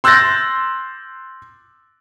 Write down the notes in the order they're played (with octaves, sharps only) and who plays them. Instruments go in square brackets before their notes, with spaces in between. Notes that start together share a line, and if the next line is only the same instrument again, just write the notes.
[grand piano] C6 E6 F#6 G6 A6 A#6